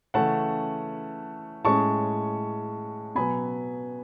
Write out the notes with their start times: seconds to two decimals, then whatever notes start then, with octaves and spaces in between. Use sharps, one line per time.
0.14 C#3 E3 A3 C#4 F#5 A5
1.64 A2 G#3 C#4 A5 C#6
3.15 B2 F#3 B3 G#5 B5